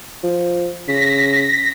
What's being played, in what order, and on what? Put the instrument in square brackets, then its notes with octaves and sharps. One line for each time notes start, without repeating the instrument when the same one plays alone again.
[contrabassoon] F3
[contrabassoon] C#3 [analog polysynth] A#6 B6